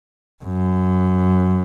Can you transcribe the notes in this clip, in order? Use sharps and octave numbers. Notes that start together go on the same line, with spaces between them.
F#2